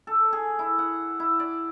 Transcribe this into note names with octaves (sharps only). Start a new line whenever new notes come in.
A4
G#4
E4
F#5
E4
D5